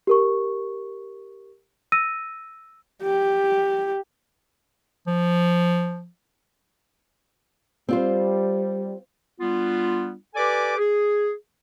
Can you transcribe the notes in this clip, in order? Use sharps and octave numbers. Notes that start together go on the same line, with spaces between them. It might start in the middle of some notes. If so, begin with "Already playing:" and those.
G4 A#4 C#6
E6 A#6 D#7
G4
F3
G3 C4 F4 C5
G3 B3 D4 F4
G4 A4 B4 D5 G#5 D6
G#4